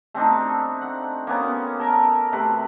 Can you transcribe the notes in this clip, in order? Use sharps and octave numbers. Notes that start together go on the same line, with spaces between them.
A3 C4 D4 D#4
F#5
A#3 B3 C#4
A4 A#4
C3 A3 B4 B5